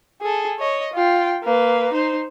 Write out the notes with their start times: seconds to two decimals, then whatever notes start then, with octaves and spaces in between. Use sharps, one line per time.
0.22 G#4 A4
0.59 C#5 D#5
0.93 F4 G5
1.43 A#3 B4
1.93 D#4 C5